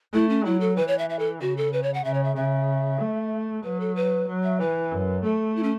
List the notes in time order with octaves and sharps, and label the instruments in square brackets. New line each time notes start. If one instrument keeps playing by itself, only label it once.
[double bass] A3 [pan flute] E4
[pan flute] C#4
[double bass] F#3 [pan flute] E4
[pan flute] A4
[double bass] E3 [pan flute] B4
[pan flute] C#5
E5
E5
A4
[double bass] C#3 [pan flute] F#4
[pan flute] A4
B4
C#5
F#5
[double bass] C#3 [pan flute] E5
[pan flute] C#5
E5
[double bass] C#3 [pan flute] E5
[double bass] A3
[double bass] F#3 [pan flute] B4
[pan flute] A4
B4
[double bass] F#3
[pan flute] E5
[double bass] E3 [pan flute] B4
[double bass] F#2
[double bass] A3 [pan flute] A4
[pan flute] E4
C#4